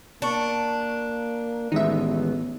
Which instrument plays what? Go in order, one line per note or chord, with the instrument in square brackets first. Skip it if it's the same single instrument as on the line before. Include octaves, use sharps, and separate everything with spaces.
[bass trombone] A#3 [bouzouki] D4 [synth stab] A5 C#6
[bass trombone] A1 [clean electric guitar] D#3 G#3 B3 [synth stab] D#4 E5